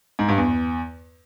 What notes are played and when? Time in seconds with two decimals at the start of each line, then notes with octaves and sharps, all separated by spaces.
0.19 G#2
0.28 G2
0.38 E2